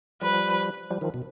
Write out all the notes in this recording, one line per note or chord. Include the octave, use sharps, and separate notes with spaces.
F3 G3 B4
F3 G3
D#3 F3
B2